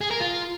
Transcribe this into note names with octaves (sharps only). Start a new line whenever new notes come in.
G#4
A#4
F4